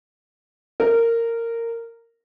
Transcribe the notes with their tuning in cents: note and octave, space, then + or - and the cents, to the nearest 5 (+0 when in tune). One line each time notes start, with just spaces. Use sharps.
A#4 -15